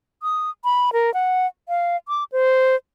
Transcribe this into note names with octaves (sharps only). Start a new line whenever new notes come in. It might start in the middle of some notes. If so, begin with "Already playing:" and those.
D#6
B5
A#4
F#5
F5
D6
C5